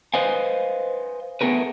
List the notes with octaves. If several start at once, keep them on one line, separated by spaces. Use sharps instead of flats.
B4 C5 D#5 F5 G#5
A3 B3 G#4 A#4 B4